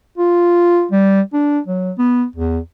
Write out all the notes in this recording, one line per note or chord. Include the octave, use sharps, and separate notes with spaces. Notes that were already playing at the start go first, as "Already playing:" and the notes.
F4
G3
D4
F#3
B3
E2